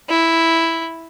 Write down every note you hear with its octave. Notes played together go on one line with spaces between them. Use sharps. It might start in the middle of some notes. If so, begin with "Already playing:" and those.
E4